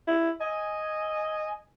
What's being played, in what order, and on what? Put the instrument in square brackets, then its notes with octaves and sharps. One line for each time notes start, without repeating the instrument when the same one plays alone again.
[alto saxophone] E4
[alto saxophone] D#5 [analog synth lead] G#5